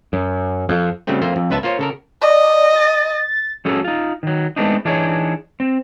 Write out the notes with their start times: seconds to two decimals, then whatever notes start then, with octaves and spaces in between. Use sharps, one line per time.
0.13 F#2
0.69 F2
1.07 C#3 F#3 G3 A3 C4
1.22 F2 A3 A#3 C5
1.36 F2
1.50 C#2 B3 B4 E5 A5
1.63 A#3 F4 C5 C#5
1.79 C#3 A4 A#4
2.22 D5 D#5
2.76 A6
3.65 F#3 C#4 G#4 A4
3.84 D#4 F4
4.23 D#3 F#3
4.56 G#3 A3 B3 C4 D4 D#4
4.85 E3 D4 D#4 G#4 C#5
5.60 C4